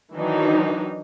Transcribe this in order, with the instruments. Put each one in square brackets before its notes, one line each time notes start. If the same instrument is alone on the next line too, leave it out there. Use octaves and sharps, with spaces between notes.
[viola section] D#3 E3 F#3 D4 D#4